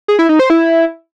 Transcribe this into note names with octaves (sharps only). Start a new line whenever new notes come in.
G#4
E4
D#4
C5
E4